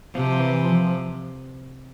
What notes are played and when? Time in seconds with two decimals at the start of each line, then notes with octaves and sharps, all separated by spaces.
0.15 C3 F3
0.40 E3
0.65 F3